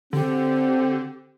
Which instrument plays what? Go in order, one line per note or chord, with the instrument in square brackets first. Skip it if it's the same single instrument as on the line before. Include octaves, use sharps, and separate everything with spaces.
[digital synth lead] D3 [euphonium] C4 [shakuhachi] G4